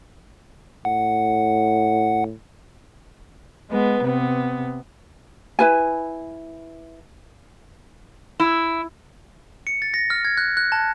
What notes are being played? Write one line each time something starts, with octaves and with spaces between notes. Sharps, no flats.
A2 F#5
G#3 B3 B4
C3 B3
E4 B4 G#5
E4
C#7
A6
A#6
F6
G#6
F#6
F#6
A5